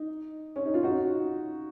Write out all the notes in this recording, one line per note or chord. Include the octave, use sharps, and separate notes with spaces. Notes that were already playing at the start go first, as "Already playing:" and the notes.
Already playing: D#4
C#4
D#4
F4
D#4 F#4